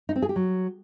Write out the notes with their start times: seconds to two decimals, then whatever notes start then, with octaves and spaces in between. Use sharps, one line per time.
0.09 D#4
0.16 C4
0.22 G#4
0.29 G4
0.36 F#3